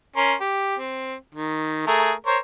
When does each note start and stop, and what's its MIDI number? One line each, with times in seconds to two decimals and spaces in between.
0.16 0.34 61
0.16 0.34 70
0.16 0.34 84
0.40 0.76 67
0.78 1.15 60
1.35 1.83 51
1.87 2.12 57
1.87 2.12 68
1.87 2.12 70
2.27 2.38 70
2.27 2.38 72
2.27 2.38 73